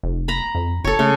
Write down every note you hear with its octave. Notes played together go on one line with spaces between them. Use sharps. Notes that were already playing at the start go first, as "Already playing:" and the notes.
F1
A#5 B5
F2
F#1 A4 C#5
C#3 A3